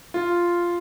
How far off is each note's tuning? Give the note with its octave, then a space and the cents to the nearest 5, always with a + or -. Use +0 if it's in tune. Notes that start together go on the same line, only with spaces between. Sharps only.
F4 -5